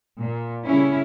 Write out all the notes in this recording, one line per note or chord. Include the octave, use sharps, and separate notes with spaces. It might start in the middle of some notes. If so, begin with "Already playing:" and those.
A#2
C#3 G3 C#4 E4